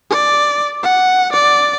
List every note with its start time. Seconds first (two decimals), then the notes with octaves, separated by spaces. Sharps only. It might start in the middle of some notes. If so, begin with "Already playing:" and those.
0.10 D5
0.83 F#5
1.32 D5